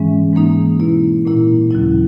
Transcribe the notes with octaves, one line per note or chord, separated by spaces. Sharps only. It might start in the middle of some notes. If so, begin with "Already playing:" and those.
Already playing: G#2 E3 G#3 C#4
G#2 E3 A#3 D#4
B2 A#3 E4
A#2 A#3 E4
D#2 C#3 F#3 C#4 E4